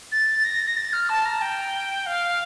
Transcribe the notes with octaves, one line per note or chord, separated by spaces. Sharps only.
A6
A#6
A#6
A6
F6
A5
A#5
G5
F5